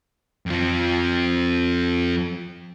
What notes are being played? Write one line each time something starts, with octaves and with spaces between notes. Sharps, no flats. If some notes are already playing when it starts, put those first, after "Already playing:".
F2 F3